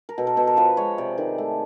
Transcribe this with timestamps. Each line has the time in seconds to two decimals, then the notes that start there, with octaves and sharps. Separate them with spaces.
0.09 A#4
0.18 B2 A4
0.27 A#4
0.37 B2 A4
0.47 A#4
0.57 F3 B4
0.77 G#3 C#5
0.98 C3 D5
1.18 D#3
1.38 A3